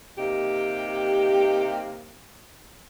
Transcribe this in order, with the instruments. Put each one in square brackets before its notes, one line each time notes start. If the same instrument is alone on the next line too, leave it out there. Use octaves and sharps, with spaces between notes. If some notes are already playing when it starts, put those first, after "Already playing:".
[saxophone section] C3 A#3 D#4 G4